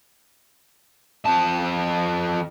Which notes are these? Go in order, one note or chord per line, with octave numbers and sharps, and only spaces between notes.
F2 A5